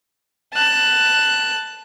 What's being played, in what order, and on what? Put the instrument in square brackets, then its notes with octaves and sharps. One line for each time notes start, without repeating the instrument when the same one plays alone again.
[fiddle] A5 F#6